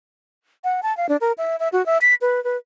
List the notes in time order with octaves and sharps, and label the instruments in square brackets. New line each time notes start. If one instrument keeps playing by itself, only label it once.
[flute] F#5
A5
F5
D4
A#4
E5
E5
F#4
E5
B6
B4
B4